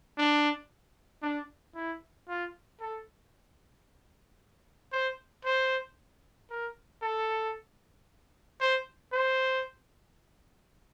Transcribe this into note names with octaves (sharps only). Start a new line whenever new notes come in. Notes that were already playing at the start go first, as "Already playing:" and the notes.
D4
D4
E4
F4
A4
C5
C5
A#4
A4
C5
C5